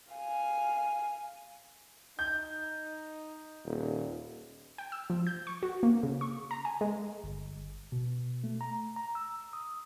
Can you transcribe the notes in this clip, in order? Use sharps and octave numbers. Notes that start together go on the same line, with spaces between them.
F5 G#5
D#4 G6
D#1
G5
E6
F3
G6
C#6
F#4
A#3
C#3
C#6
A#5
G#5
G#3
G1
B2
A3
A#5
A#5
E6
D#6